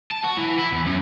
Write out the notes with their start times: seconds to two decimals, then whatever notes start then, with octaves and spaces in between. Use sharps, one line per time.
0.11 A5
0.24 F#4
0.37 E3
0.59 E4
0.72 E2
0.86 F#2